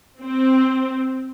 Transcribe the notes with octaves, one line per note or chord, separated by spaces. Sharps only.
C4